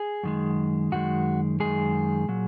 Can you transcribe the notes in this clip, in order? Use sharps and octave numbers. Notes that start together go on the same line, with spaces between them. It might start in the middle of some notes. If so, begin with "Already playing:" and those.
Already playing: G#4
F#2 D#3 G#3
F#2 D#3 G#3 F#4
F#2 D#3 G#3 G#4
A#2 F#3